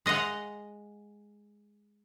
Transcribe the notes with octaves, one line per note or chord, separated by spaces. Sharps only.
G#3 D#5 F5 F#5